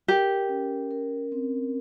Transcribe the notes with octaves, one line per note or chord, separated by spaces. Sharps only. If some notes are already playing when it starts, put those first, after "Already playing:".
G4 A#4
C#4
A#4
C4